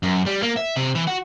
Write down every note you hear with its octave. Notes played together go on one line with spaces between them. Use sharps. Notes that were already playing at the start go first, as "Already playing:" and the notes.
F#2
G3
A#3
E5
C3
E3
F#4